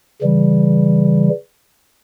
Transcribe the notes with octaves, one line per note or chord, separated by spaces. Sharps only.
C#3 E3 G3